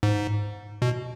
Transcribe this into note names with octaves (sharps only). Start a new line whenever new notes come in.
G#2
B2